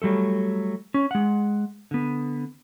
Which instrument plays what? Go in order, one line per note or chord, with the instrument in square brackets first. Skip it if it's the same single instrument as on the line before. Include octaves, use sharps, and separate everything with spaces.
[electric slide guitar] F#3 G3 A3 A4
C#4
G#3 F#5
D3 B3